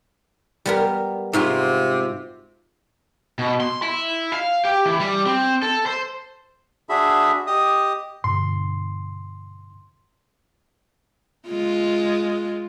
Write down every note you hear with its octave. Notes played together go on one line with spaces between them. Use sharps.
G3 B3 A#4
G#2 C3 F4 F#4
B2
C6
E4
F5
G4
E3
G3
C4
A4
C5
D4 F#4 G#4 E5 B5
G4 D#5 D#6
G2 B2 D3 C6
G#3 F4